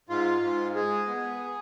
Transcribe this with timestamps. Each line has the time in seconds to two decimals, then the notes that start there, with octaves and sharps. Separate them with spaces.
0.09 G#2 F4
0.42 G#2
0.75 G#3 G#4
1.08 B3